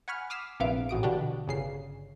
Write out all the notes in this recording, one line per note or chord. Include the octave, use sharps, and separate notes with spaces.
F#5 G#5 B5 C#6 F6
D6 D#6 F6 B6 C7 E7
A#1 C3 B3 E4 F5 D7
A1 F#4 D#6 D7
B2 D3 D4 F#4 G4
G1 C#3 C7